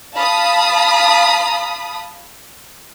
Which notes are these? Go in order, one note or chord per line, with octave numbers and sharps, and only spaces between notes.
F5 A5 B5 D#6